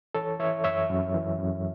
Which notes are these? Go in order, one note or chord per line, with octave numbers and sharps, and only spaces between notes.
E3 A4 C#5
E3 C#5 E5
F#2 C#5 E5
F#2
E3
F#2